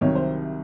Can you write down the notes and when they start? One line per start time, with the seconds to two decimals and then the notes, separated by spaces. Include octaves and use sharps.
0.01 C2 C3 D#3 F#3 C#5
0.15 C5